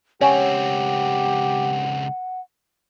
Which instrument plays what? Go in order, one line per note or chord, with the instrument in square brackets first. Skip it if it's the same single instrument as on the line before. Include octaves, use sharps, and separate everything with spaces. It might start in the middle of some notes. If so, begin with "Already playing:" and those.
[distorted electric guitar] C#2 C4 [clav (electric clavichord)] C#4 [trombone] G4 [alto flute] F#5